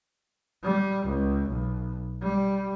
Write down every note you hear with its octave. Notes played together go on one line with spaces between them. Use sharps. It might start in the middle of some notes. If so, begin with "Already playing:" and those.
G3
C#2
B1
G3